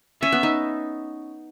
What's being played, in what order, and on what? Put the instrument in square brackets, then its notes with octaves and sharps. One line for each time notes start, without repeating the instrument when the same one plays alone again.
[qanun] C#4 [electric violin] E5
[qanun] B3
D#4